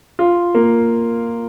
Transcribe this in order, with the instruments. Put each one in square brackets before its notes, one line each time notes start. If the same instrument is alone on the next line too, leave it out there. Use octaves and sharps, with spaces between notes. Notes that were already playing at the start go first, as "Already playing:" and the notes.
[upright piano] F4
A#3